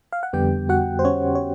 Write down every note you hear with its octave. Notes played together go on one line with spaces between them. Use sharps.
F5
F#5
F2 D3 G3 B3 G4 G5
F#4 F#5
C5
C#4 C#5
C#5